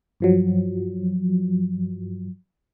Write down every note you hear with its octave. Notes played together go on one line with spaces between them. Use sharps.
G2 F3 F#3